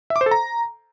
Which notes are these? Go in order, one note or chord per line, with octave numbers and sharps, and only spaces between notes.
E5
D6
C5
A4
A#5